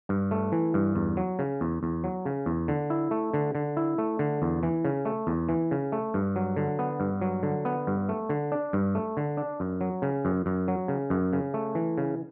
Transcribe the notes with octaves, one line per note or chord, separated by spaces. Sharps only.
G2
A3
E3
G2
E2
F#3
C#3
E2
E2
F#3
C#3
E2
D3
E4
A3
D3
D3
E4
A3
D3
E2
E3
C#3
A3
E2
E3
C#3
A3
G2
F#3
D3
B3
G2
F#3
D3
B3
G2
A3
D3
D4
G2
A3
D3
D4
F#2
F#3
C#3
F#2
F#2
F#3
C#3
F#2
C#3
A3
E3
C#3